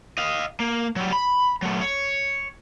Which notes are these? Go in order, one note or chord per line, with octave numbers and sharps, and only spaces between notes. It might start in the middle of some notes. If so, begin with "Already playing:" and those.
D#5 F5
A#3
F#3 G3
B5
F#3 A3
C#5